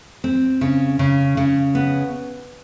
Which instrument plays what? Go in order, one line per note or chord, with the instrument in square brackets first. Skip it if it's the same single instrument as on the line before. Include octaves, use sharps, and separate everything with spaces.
[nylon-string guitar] C4
C#3
C#3
C#3
B3